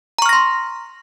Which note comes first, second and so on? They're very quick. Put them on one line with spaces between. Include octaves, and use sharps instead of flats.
A#5 C#6 F6 A#6 C6